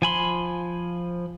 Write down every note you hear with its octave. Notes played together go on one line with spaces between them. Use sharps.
F3 G#5 B5 C6